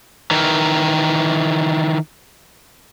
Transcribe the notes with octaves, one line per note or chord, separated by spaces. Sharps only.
D#3 E3